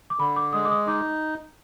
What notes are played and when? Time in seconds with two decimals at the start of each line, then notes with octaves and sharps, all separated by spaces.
0.10 D6
0.20 D3 B5
0.36 D6
0.53 G#3 D#6
0.65 D6
0.71 D#6
0.87 D#4 D6